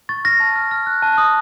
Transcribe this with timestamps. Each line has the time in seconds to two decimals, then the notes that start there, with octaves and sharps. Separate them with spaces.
0.09 C#6 A6
0.25 F6 A#6
0.40 A5
0.56 F6
0.71 F6
0.87 F#6
1.02 A5
1.18 D#6